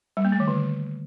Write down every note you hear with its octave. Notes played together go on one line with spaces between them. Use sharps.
G3
A#3
A3
D#3
D3